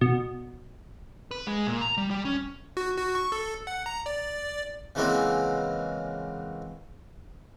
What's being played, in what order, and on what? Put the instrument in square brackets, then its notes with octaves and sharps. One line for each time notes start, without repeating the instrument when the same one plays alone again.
[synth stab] B2
[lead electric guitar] B4
G#3
A#2
A#5
G3
G3
C#4
[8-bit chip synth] F#4
F#4
C#6
A4
F#5
A#5
D5
[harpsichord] C#3 E3 F#3 G#3 A#3 C4